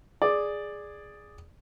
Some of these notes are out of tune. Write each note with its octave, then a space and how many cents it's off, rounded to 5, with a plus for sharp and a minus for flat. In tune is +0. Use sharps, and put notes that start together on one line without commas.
G#4 +0 D5 +5